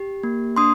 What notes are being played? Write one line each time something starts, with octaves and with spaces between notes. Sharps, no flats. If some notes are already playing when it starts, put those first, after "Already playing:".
Already playing: G4
A#3
D4 C6 D#6